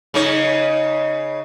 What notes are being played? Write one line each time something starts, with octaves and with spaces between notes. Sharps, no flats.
C#3 D#4 C#5